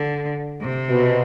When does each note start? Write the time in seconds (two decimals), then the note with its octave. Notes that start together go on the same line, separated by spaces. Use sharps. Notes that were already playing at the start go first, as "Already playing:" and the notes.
Already playing: D3
0.61 C3
0.90 B2